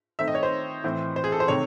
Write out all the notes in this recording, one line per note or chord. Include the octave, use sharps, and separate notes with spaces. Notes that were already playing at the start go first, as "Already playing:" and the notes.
D#3 A3 C4 E5
D#5
C#5
C5
A2 E3 C4
C5
G#4
A4
C5
C3 D#3 A3 C4 C#5